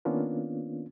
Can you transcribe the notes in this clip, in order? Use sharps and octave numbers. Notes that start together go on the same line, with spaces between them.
D#3 A#3 B3 C#4 D4 F4